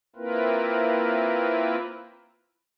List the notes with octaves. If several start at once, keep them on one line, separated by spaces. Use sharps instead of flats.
A#3 C4 E4 F4 A#4 B4